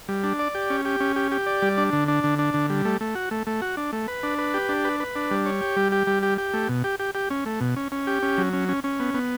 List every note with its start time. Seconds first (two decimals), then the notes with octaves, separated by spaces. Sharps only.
0.08 G3
0.24 D4
0.39 D5
0.55 G4
0.70 C#4
0.85 G4
1.00 C#4
1.16 G4
1.32 G4
1.46 D5
1.62 G3
1.78 D4
1.93 D3
2.08 D4
2.24 D3
2.39 D4
2.54 D3
2.70 G3
2.85 A3
3.01 A3
3.15 F#4
3.31 A3
3.47 A3
3.62 F#4
3.77 D4
3.93 A3
4.08 B4
4.23 D4
4.39 B4
4.54 G4
4.69 D4
4.85 B4
5.00 B4
5.16 D4
5.31 G3
5.46 C#5
5.61 G4
5.77 G3
5.92 G4
6.07 G3
6.23 G4
6.38 G4
6.54 A3
6.69 B2
6.84 G4
6.99 G4
7.15 G4
7.30 C#4
7.46 A3
7.61 B2
7.76 C#4
7.92 C#4
8.07 G4
8.23 C#4
8.38 F#3
8.53 C#4
8.69 C#4
8.84 C#4
9.00 B3
9.14 B3